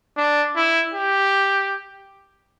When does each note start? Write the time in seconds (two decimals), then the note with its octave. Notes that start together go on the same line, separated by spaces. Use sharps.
0.17 D4
0.56 E4
0.94 G4